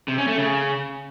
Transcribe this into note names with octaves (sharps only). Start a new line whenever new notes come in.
C3
C#4
A3
C#3